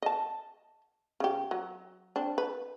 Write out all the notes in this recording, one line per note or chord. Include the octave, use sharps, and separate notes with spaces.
D#5 A5
C#3 G4
F#3
C4 D4
B4